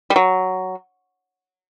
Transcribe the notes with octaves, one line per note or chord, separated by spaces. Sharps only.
G3
F#3